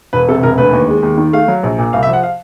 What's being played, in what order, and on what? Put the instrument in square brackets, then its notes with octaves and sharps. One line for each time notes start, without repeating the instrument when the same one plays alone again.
[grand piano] E1 B4
C3 A4
E1 A#4
D2 B4
D#2
G#3
D#2
D#3
A3 F5
F#3
A#1
A#2
C2 F5
E5
F3
F#5
F5